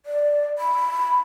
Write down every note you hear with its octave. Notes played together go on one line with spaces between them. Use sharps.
D5
B5